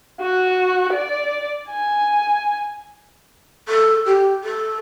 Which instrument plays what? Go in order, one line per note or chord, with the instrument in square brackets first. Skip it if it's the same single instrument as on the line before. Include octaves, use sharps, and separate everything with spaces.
[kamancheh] F#4
D5
G#5
[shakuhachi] A4
G4
A4